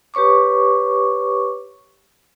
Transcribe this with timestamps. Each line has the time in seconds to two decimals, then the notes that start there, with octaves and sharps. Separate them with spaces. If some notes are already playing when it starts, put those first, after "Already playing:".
0.14 G4 B4 C#5 C#6 D6